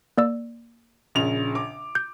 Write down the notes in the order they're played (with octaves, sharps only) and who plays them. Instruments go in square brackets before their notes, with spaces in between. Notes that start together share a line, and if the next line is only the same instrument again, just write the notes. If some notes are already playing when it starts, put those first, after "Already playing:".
[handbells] A#3 D5 E6
[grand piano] A#1 C#3 F7
D6
[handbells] G6